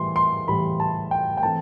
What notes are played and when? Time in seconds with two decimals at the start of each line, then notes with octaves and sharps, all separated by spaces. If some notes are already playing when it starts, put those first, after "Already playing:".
Already playing: A2 E3 G3 C6
0.16 C6
0.47 A2 E3 G3 B5
0.80 A5
1.11 G5
1.37 G5
1.42 E3 A3 C4 A5